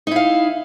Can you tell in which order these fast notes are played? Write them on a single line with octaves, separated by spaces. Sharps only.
D#4 E4 F5